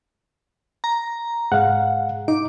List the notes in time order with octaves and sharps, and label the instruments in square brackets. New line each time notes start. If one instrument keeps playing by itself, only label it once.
[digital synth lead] A#5
[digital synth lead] G#2 [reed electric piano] F5 F#5
[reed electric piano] D#4 [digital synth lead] D6